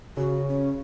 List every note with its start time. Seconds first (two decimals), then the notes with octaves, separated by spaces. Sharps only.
0.17 C#3 F#4
0.48 C#4